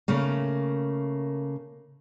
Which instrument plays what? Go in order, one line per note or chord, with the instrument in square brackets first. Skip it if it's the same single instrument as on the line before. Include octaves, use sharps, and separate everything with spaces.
[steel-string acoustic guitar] C#3 A3 A#3